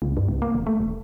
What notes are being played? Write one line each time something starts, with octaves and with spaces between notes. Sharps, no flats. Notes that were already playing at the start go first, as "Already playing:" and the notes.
C#2
G2
C2
A#3
D#1
A3
D#1